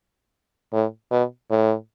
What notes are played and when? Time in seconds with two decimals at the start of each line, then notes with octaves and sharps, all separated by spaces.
0.73 A2
1.11 B2
1.50 A2